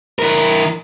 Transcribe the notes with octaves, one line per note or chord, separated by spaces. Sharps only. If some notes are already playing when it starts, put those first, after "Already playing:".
E3 A#4